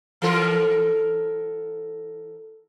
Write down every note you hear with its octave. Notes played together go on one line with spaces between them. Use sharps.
E3 A4 A#4